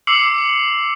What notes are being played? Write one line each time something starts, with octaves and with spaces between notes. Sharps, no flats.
D6 E6 C7 C#7 F#7